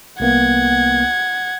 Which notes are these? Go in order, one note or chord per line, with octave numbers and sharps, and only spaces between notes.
C2 A#3 B3 F#5 G#6